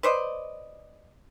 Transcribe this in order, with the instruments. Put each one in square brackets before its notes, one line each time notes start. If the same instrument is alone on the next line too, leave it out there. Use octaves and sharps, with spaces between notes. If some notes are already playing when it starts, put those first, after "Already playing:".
[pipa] B4 C5 D5 D#5